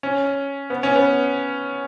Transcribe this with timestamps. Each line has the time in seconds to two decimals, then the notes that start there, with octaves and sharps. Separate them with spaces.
0.03 C#4
0.70 B3
0.83 C#4
0.96 B3